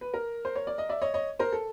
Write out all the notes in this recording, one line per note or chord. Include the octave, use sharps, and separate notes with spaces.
B4
A#4
C5
C#5
D5
D#5
D5 E5
C#5 D#5
C#5 D#5
A#4 C5
A4